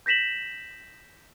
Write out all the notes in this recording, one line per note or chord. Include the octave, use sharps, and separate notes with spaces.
G6 A#6 B6 E7 F#7